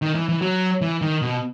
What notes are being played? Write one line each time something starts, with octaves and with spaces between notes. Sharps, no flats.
D#3
E3
E3
F#3
E3
D#3
B2